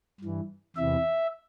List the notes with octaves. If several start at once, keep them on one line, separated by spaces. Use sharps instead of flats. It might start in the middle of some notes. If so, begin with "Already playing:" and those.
G2 E3
E2 C3 E3 E5